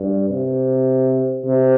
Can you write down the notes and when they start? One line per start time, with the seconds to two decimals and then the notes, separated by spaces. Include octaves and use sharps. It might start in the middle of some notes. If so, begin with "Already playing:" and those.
Already playing: G2
0.30 C3
1.45 C3